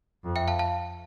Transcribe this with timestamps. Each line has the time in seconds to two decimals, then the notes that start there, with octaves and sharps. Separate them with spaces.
0.24 F2
0.36 E5 G5
0.48 F5 A5
0.59 F5 A5